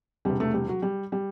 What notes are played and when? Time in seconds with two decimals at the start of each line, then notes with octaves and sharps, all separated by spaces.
0.25 E1 E2 C3 G3
0.40 A3
0.54 G3
0.69 F#3
0.82 G3
1.12 G3